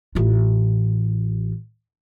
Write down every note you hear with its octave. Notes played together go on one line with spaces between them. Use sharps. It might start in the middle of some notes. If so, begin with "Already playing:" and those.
A1 F4